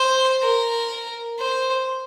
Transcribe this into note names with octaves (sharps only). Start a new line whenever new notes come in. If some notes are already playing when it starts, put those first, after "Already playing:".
Already playing: C5
A#4
C5